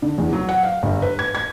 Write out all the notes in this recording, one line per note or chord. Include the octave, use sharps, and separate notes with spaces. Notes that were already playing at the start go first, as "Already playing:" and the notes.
D3
E2
F#3
F#5
F5
G1
B4
G#6
G#6